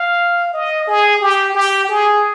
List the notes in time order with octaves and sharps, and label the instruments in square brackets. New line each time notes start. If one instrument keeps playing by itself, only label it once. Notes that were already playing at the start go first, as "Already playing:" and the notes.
Already playing: [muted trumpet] F5
D#5
G#4
G4
G4
G#4